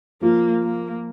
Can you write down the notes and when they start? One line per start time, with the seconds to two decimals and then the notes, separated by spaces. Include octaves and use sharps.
0.21 F3 A#3 F4
0.63 A#3